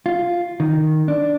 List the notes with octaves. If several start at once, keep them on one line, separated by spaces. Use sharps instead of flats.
F4
D#3
D4